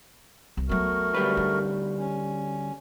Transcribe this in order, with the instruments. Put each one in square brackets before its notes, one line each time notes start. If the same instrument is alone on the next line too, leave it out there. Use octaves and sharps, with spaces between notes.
[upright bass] C2
[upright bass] F#3 B3 [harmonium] A3 F#4 A#4
[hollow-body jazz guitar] D2 G3 B4
[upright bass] D#4
[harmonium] C#4